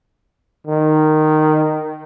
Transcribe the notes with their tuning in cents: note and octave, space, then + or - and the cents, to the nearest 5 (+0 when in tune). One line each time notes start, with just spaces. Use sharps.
D#3 -10